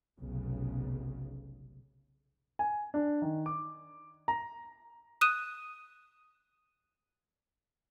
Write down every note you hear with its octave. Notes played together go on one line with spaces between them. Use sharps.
F1 B1 C#3
G#5
D4
D#3
D6
A#5
D#6 F#6 D#7 E7